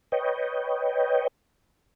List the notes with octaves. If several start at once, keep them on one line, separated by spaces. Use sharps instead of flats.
B4 C#5 D#5 G5